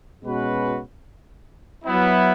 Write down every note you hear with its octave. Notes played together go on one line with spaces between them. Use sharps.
B2 G#3 C#4 F#4 B4
F#3 B3 E4